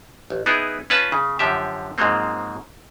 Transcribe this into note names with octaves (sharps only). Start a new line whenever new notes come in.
A1
B3 D#4 E4 G#4 B4
C#4 F4 B4 G#5 A5
C#3
F#2 D3 F3 G4 E5
G#2 F3 F#3 G#3 A#3 C4